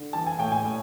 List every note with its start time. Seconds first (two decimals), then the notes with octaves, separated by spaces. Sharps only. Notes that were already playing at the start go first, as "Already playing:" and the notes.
Already playing: D3
0.13 E3 A5
0.26 G#5
0.39 A2 G5
0.52 G#5
0.65 A2